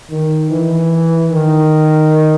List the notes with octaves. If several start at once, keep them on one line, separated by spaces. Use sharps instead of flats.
D#3
E3
D#3